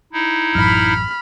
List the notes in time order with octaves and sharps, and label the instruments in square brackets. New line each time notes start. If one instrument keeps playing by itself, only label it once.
[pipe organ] D#4 E4
[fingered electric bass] A1 F#2 [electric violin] B5 F6